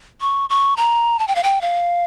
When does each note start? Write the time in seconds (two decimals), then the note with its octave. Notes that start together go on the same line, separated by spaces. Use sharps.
0.21 C#6
0.50 C#6
0.77 A#5
1.19 A5
1.28 G5
1.35 F5
1.43 G5
1.61 F5